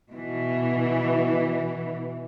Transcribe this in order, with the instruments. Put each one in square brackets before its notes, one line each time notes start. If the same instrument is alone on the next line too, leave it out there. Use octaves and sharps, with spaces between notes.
[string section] B2 E3